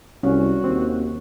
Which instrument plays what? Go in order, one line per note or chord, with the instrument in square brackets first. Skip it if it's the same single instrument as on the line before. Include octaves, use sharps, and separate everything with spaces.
[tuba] C2 [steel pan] C#4 [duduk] F#4
[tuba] D#2 [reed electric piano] C4